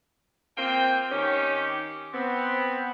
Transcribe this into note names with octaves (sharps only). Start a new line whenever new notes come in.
A#3 C4 F4 G5
D#3 C#4 G4
B3 C4